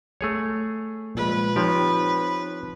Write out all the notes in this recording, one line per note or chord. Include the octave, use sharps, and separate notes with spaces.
A3 G#4 C#5
A#2 F3 G#3 B4
F3 C4 D#4 G4 C#5